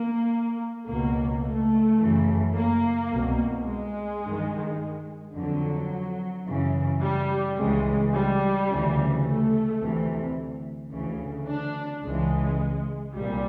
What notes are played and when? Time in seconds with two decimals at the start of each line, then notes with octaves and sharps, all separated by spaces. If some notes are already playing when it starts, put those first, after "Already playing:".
Already playing: A#3
0.87 C#2 B2 A#3
1.43 A3
1.98 F#2 C#3 E3
2.55 A#3
3.11 C2 B2
3.66 G#3
4.23 G2 D#3
5.34 F2 D3 F#3
6.46 F#2 C#3 E3
7.02 G3
7.58 C#2 C#3 E3 G#3
8.14 G3
8.69 D2 C#3 E3
9.25 A3
9.81 D2 C3 E3
10.92 D2 C#3 E3
11.48 D4
12.04 C#2 C#3 E3 G#3
13.15 C2 A#2 G3